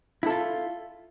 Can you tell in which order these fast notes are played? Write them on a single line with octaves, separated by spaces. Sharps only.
E4 A4 F4